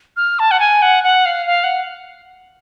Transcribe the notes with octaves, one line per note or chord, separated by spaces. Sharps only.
F6
A5
F#5
G#5
F#5
F#5
F5
F5
F#5